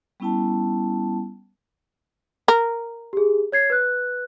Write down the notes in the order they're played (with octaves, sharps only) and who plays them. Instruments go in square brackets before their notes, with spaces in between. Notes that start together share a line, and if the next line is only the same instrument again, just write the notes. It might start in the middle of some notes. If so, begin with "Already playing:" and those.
[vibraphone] G3 B3 C#4 E4 G5 A5
[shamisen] A#4
[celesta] G4 G#4
C#5 G#6 C7
B4 F#6